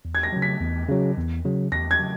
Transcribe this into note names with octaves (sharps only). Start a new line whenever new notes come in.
E2
G#6
A#6
C#3 F#3
B6
E2
C#3 F#3
E2
C#3 F#3
E2 A#6
G#6
C#3 F#3